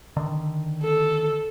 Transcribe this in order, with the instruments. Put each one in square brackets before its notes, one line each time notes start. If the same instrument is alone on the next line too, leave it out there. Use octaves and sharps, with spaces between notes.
[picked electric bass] D3 D#3
[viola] A4